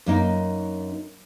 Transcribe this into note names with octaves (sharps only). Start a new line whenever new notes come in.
F#2 A#3 D#4